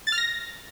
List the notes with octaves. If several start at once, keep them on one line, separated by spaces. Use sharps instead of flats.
A6
F6
A#6